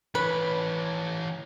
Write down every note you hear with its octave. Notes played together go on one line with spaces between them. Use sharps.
E3 B4 C#5